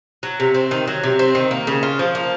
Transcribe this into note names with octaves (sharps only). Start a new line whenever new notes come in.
F#3
C3
C4
D#3
F#3
C3
C4
D#3
A#3
C#3
F4
F3
A#3